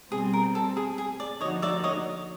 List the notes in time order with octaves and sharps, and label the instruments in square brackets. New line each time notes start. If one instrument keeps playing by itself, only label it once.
[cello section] B2 G3 C4 [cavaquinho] G#4
[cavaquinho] A#4
A4
G#4
G#4
D5
[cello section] D3 F3 A#3 D#4 F#4 [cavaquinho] C#5 D#5
[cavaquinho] D5 E5
C#5 D#5